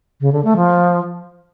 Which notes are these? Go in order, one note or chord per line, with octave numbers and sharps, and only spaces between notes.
C#3
D3
A3
F3